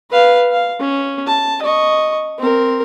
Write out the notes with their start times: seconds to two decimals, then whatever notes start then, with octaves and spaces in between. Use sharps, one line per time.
0.11 B4 F5
0.52 F5
0.80 C#4
1.26 A5
1.62 D#5 C#6
2.39 C4 A#4